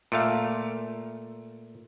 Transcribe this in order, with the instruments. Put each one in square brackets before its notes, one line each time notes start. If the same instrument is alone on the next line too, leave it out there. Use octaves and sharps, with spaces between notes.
[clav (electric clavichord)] A#2 A3 F5